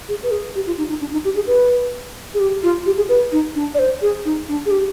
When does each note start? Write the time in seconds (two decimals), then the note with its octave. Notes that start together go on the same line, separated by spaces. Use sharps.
0.08 G#4
0.23 B4
0.31 G#4
0.55 G4
0.67 F4
0.78 D#4
0.89 D#4
1.01 D4
1.12 D#4
1.25 G4
1.36 G#4
1.47 B4
2.34 G#4
2.40 G4
2.63 F4
2.86 G4
2.97 G#4
3.09 B4
3.32 D#4
3.55 D4
3.74 D5
3.79 C5
4.02 G#4
4.25 D#4
4.49 D4
4.66 G#4
4.71 G4